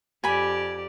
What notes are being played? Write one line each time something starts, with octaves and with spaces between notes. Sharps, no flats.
F2 G4 D5 G#5 B5